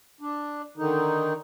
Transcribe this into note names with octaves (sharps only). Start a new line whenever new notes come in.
D4
D3 D#3 D#4